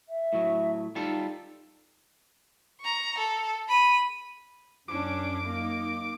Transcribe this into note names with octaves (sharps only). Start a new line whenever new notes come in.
E5
A2 F#3
G3 D#4 F4 A4
A#5 C#6
A4
B5 D#7
F#2 C#4 D4 D6
A#3 D#4